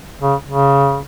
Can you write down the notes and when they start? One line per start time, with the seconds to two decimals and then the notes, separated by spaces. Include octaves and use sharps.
0.22 C#3
0.47 C#3